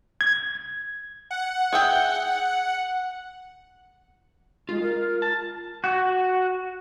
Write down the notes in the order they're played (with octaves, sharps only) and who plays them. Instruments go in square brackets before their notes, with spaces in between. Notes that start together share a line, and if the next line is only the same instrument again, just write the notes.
[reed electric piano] G#6
[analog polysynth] F#5
[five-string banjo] G#4 E5 G5
[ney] G#3 [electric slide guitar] F4
[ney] A#4
[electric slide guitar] A5
[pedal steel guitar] F#4